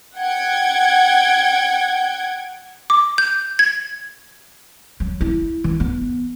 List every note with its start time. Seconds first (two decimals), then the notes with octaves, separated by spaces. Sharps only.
0.17 F#5 G5 G#6
2.90 D6
3.18 G6
3.59 G#6
5.00 F#3
5.21 E4
5.64 E3
5.80 B3